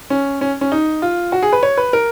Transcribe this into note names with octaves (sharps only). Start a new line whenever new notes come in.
C#4
C#4
C#4
D#4
F4
F#4
G#4
B4
C#5
B4
A#4